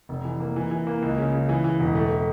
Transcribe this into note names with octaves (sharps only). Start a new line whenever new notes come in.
F1
E3
A#3
E3
E3
A#3
C#2
C#3
C#3
E3
E3
E1
A3
A3